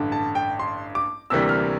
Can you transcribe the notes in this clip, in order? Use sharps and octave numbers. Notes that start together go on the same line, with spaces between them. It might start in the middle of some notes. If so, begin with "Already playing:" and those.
Already playing: A1 G2 D3
A5
G5
C6
D6
D2 C3 E3 G3 A#3 E6
F6